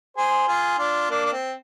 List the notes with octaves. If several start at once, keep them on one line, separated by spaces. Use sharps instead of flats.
G#4 C5
F4 G#4
D4 F4
A#3 D4
D4
C4